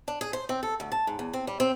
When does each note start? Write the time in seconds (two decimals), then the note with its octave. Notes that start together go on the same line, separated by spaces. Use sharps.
0.08 D4
0.21 G#4
0.33 C5
0.49 C4
0.63 A4
0.80 D2
0.92 A5
1.07 G#2
1.19 E2
1.33 C4
1.47 G3
1.60 C4